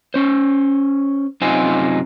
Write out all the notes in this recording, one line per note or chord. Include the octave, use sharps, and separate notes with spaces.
C#4 C5
F#2 C3 D#4 F4 C5 G#5